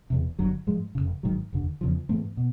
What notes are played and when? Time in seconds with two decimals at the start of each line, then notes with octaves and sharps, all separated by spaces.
0.10 E1 E2 C3
0.39 G1 G2 D3 F#3
0.67 G#2 F3 G#3
0.95 F1 F2 C#3
1.23 G#1 G#2 D#3 F#3
1.53 F1 D#2 D3
1.81 E2 C#3 F3
2.09 G#2 E3 A3 C4
2.37 B2